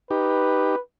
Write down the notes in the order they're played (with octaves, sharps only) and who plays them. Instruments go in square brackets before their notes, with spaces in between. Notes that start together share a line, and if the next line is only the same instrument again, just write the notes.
[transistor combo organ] D#4 G4 [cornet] B4